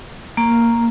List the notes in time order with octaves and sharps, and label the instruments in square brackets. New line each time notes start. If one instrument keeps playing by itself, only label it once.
[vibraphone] A#3